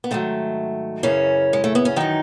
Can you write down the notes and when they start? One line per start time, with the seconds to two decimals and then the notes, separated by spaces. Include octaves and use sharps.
0.04 B3
0.11 G#2 D#3 F#3 A3
1.03 F#2 C#3 E3 C#4
1.53 G#3
1.64 A3
1.75 B3
1.85 C#4
1.96 F#2 D#3 E3 D#4